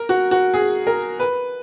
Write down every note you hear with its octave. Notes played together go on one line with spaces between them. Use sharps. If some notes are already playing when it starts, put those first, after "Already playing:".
Already playing: A#4
F#4
F#4
G#4
A#4
B4